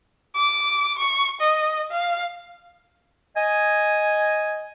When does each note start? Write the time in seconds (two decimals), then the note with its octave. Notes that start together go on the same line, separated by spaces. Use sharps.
0.35 D6
0.99 C#6
1.41 D#5
1.91 F5
3.36 D#5 G#5